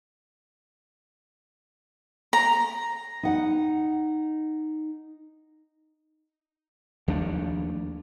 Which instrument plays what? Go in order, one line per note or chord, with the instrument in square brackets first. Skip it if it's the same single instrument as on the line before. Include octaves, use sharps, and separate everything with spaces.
[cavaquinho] A#5
[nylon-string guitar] D#4 F#5
[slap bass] D#2 F3 A3 D4